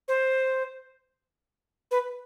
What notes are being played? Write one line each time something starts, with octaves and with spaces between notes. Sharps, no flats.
C5
B4